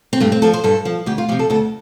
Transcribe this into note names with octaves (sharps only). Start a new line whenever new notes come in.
C4
G2 A3
C4
F3 A4
C5
G2 A4
F3
D2 G4
F4
C3 F3 G4
A4
D2 A4